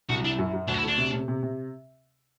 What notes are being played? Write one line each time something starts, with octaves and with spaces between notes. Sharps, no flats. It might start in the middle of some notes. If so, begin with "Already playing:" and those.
C2 F#4
D4 E4
F#2
F#2
D2 D4
F#4
E4
A3 D4
C3
C3
C3
C3